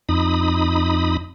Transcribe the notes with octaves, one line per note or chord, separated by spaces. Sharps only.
F2 D#4 B5 D#6